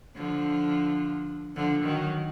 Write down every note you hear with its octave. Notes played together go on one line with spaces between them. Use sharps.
D3 F3
D3 F3
D#3 F#3